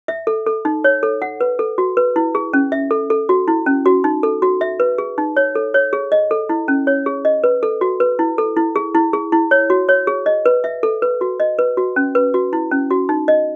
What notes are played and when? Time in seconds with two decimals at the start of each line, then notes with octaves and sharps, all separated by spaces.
0.08 E5
0.27 A4
0.47 A4
0.65 D#4
0.84 C#5
1.03 A4
1.22 F#5
1.41 B4
1.59 A4
1.78 F#4
1.97 B4
2.16 E4
2.35 G#4
2.53 C#4
2.72 E5
2.91 A4
3.10 A4
3.29 F#4
3.48 E4
3.66 C#4
3.86 F#4
4.04 D#4
4.23 A4
4.42 F#4
4.61 E5
4.80 B4
4.98 G#4
5.18 D#4
5.36 C#5
5.55 A4
5.74 C#5
5.93 G#4
6.12 D#5
6.31 A4
6.49 E4
6.68 C#4
6.87 C#5
7.06 G#4
7.25 D#5
7.44 B4
7.63 A4
7.81 F#4
8.00 B4
8.19 E4
8.38 A4
8.57 E4
8.76 G#4
8.95 E4
9.13 G#4
9.32 E4
9.51 C#5
9.70 F#4
9.89 C#5
10.07 G#4
10.26 D#5
10.46 B4
10.64 E5
10.83 A4
11.02 B4
11.21 F#4
11.40 D#5
11.59 B4
11.77 F#4
11.96 C#4
12.15 B4
12.34 F#4
12.53 E4
12.71 C#4
12.90 F#4
13.09 D#4
13.28 D#5